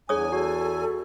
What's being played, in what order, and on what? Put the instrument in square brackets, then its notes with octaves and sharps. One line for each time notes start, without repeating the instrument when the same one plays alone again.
[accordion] E2 G#5 [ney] D4 [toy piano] G#4 C#5 D#6
[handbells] F#4 [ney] A4